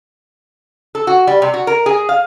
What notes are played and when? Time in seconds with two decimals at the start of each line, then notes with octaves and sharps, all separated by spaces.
0.95 A4
1.07 F#4
1.27 G3
1.42 C3
1.54 F#4
1.67 A#4
1.86 G#4
2.09 F5